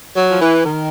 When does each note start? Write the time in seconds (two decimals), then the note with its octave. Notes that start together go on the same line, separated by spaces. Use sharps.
0.16 F#3
0.30 F3
0.41 E3
0.66 D#3